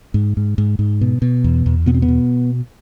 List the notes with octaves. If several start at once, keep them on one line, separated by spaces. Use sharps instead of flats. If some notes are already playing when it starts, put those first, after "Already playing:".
G#2
G#2
G#2
G#2
B2
B2
E2
E2
B2 B3
C4
B3
B2